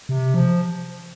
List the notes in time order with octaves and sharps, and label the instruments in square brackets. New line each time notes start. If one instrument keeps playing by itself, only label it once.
[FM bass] C3
F3